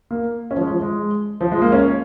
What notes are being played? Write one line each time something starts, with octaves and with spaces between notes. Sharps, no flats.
A#3
C#4
F3
G#3
F3
G#3
F3
G#3
A#3
C#4